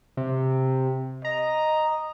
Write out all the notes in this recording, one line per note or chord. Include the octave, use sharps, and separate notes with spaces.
C3
D#5 A#5